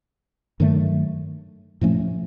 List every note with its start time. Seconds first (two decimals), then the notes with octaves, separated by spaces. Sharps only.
0.60 G2 D#3 F#3 A3
1.81 A2 F3 A3 C#4